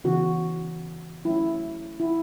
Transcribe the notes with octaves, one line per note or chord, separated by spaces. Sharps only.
C#3 E3 B3 F#4
F#3 A3 C#4 E4
E4